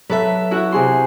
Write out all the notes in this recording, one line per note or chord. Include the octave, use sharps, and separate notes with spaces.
F#3 A4 B4 E5
E4 F#4
C3 G#4 C6